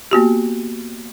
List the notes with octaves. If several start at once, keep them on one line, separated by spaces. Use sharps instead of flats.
A#3 B3 F#4 G4